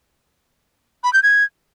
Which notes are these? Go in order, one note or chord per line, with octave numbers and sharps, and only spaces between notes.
B5
G6
G#6